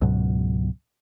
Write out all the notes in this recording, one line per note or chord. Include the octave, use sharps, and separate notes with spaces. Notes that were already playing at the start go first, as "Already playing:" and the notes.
C#2 G#2 B2 F#3